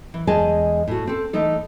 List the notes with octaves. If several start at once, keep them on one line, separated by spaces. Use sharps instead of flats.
E3
E2 G#3 G#4 D#5 G#5 A5
A2 F#4
C4 A4
E3 A3 D#4 A4